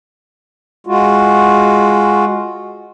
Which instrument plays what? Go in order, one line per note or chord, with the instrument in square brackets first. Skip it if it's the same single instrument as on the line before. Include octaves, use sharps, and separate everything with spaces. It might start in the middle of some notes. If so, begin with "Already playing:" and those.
[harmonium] G#3 F4 F#4